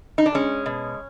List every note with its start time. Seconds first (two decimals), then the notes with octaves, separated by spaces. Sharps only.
0.18 D#4
0.26 D4
0.35 G#3 C#4
0.66 B2